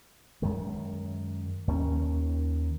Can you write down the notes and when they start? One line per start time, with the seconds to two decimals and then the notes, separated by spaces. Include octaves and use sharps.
0.42 F#2 D#3 G#3
1.68 D#2 D#3 G#3 C#4